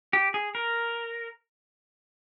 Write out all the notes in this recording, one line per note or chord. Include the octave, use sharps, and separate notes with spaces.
G4
G#4
A#4